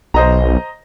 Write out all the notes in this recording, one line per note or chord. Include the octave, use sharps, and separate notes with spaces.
B1 C5 D#5 A#5